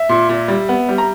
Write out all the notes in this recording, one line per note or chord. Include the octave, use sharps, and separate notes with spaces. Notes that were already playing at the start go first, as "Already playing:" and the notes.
Already playing: E5
A#2
A#2
G3
B3
G3
A#5